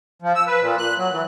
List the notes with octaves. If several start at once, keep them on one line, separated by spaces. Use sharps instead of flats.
F3
E6
B4
A#2
F#6
F#3
E3